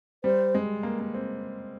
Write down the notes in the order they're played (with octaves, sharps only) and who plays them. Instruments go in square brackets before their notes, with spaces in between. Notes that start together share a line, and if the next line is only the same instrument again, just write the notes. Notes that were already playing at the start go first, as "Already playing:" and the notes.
[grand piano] G3 [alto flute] C5
[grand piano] G#3
A#3
A#3
C4